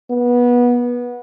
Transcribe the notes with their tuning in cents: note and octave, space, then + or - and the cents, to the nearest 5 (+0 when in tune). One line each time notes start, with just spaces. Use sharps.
B3 -20